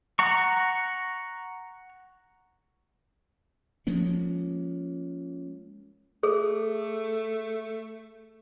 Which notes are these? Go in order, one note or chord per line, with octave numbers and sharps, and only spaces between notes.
F#5 A#5 C#6
F3 G#3 A#3 C#4
A3 G#4 A4